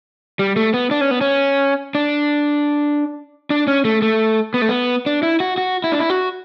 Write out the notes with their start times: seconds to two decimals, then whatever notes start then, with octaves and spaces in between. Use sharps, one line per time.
0.39 G3
0.56 A3
0.74 B3
0.91 D4
1.01 C#4
1.11 B3
1.21 C#4
1.95 D4
3.50 D4
3.68 C#4
3.85 A3
4.02 A3
4.54 B3
4.62 A3
4.69 B3
5.06 D4
5.23 E4
5.40 F#4
5.58 F#4
5.84 E4
5.92 D4
5.99 E4
6.10 F#4